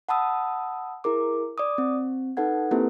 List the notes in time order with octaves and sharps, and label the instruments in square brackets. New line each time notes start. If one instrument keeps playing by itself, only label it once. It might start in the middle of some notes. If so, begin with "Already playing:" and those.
[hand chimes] F#5 A5 B5 D#6 E6
E4 G#4 A#4 D6
D5 D6 D#6
C4
D#4 A4 B4 F#5 G#6
A#3 C4 E4 G4 A4 B4